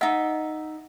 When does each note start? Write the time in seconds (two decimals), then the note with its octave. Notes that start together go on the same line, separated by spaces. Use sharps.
0.01 D#4 D#5 E5 F#5 G#5